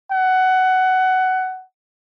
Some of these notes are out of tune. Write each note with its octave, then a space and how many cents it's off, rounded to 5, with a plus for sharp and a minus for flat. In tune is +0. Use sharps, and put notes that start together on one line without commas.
F#5 +15